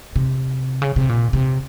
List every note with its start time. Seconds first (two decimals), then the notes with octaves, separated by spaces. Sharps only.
0.16 C3
0.82 C#3
0.96 C3
1.09 A#2
1.33 C3